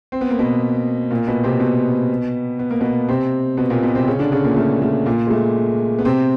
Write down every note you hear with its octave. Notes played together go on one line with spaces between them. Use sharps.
C4
B3
A#3
B2 B3
A#2 A#3
B2 B3
C3 C4
B2 B3
B3
A#3
B2 B3
C3 C4
B2 B3
A#2 A#3
B2 B3
C3 C4
C#3 C#4
D3 D4
C#3 C#4
A#2 A#3
A3
A3
A#2 A#3
G#3
A3
B3
C3 C4